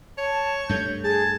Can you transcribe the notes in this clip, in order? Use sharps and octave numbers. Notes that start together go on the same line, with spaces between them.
C#5 A5
G2 A3 G6
G#4 A5 G#6